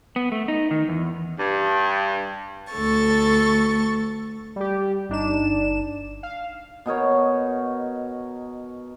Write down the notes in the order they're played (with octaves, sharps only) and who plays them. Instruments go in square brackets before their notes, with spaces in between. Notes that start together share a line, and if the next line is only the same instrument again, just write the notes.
[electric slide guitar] B3
A3
D#4
D#3
E2
[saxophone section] G2
[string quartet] D2 A4 C#6 A6
[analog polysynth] G3 G4
G1 D4 D#4 E7
F5
[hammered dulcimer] B2 D#4 A#4 C#5